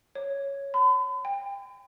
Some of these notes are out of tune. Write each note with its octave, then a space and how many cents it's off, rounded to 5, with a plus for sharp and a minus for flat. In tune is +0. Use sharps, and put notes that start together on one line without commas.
C#5 +0
B5 +45
G5 +30